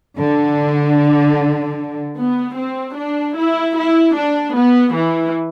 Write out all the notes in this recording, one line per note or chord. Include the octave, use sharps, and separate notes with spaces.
D3
B3
C4
D4
E4
E4
D4
B3
E3